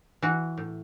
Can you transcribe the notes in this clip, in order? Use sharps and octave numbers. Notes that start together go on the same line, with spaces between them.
E3 F#4
A2